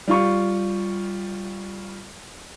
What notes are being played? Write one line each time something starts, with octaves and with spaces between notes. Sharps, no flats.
G3 F4 C#6